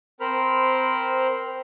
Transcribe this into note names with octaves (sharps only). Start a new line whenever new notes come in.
C4 A#4 C5 B5 F6